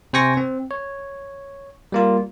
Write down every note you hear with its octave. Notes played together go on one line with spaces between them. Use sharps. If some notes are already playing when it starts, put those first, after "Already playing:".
C3 C5 G5 G#5 C#6 A#6
C4
C#5
G3 A#3 F4